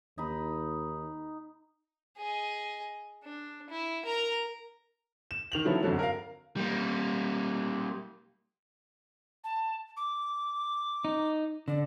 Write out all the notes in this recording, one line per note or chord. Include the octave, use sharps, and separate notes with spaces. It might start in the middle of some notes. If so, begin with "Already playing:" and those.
D#2 D#4 B5
G#4 D#5
D4
E4
A#4 A#5
E7
D#3 F7 F#7
D3 F3 F#3 B3 E4
G1 F2 D3 F#3
A#4 F5
G3 A#3
A5
D6
D#4
D3 D5